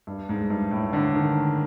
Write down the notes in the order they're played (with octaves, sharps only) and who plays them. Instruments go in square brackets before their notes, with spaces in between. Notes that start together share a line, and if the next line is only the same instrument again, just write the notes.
[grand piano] G2
G#2
G2
A2
D3
D#3